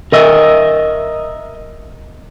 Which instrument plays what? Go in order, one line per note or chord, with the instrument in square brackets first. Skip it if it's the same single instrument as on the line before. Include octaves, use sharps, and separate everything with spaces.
[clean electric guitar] A#4 D#5 E5